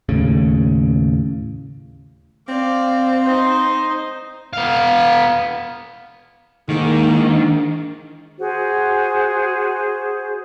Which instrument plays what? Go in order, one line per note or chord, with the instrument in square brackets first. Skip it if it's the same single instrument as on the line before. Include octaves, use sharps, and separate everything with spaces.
[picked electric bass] D#2 A2 C#3
[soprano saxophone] C4 [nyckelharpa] D5 F5
[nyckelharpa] D#4 C5
[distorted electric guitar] B3 F5
[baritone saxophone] G#2 [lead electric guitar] D#3 [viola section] A#3 [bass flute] E4
[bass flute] D4
[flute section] F#4 G#4 C5